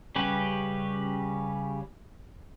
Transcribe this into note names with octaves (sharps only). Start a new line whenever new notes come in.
C#3 G3 C#4 G4 B4